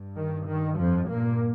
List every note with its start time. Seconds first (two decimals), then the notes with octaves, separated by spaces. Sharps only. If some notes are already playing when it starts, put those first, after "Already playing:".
Already playing: G2
0.16 D#3
0.47 D#3
0.78 F2 F3
1.09 G2 A#2 A#3